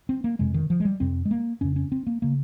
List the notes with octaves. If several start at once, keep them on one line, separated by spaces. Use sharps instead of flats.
C4
A#3
F2 C3 G#3
D#3
F3
G#3
G3
F2 C3 C4
G#3
A#3
F2 C#3 C#4
C#4
C4
A#3
C#3 A#3